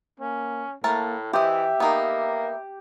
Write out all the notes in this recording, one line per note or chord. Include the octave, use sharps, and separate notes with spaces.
A#3 C#4
A2 A3 A#3 A#4 A5
E3 G4 C5 D#5 E5
A#3 B3 D#4 A#4